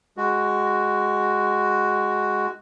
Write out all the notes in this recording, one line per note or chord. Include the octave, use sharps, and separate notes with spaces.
G#3 F#4